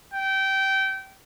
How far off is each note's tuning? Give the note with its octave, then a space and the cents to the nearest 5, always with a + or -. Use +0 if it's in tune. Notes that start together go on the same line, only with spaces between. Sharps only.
G5 -20